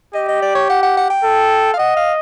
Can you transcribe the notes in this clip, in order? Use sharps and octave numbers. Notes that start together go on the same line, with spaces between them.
G4 D#5
D#5
D5
C#5
F#5
F#5
F#5
G5
A4
F5
D#5 F#5
F5